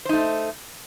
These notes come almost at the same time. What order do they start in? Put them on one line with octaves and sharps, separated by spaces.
C5 D#4 A3